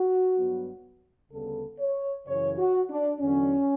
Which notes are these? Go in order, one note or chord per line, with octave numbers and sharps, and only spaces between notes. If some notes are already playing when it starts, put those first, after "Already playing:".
Already playing: F#4
G2 F#3 B3
D2 C#3 G3 B3 A4
C#5
F#2 C#3 E3 C#5
F#4
D4
E2 D3 F#3 C#4